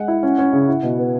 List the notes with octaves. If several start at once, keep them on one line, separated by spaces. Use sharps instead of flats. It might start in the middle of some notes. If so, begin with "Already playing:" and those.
Already playing: G#3 F#5
E4
C#4
C#4
C#3
E4
B2
B3